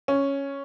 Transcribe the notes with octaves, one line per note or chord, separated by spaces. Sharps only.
C#4